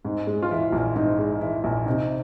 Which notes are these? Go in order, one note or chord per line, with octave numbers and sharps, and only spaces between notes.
G#2
G#3
F4
E3 E4
A#1
G#2 D#4
G#3
E3 E4
A#1
C3 D#4